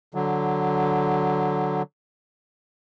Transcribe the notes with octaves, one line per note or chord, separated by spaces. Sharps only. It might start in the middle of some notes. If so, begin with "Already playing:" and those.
D3 F#3